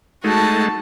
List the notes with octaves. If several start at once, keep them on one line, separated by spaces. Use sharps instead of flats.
G#3 A3 D#4 F#4 A5